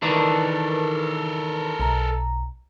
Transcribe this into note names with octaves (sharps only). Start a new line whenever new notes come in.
D#3 E3 D4 A4 A#4
B1 A#5